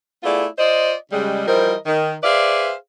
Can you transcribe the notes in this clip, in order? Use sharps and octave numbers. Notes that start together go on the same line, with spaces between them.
A3 B3 E4 F4 G#4 D5
F4 C5 D5 D#5
C#3 G3 G#3
E3 F3 G3 A#4 C5 D#5
D#3
G#4 B4 C5 D5 E5 F5